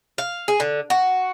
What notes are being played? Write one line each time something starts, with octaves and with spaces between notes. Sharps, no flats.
F5
G#4
D3
F#4